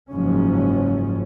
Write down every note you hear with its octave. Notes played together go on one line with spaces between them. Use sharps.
F#1 G#2 F3 C#4